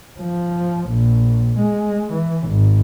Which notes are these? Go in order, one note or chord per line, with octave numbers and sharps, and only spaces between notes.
F3
A#1
G#3
E3
G#1